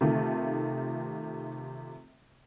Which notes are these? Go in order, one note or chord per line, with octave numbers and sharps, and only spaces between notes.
C3 D#3 A3 F4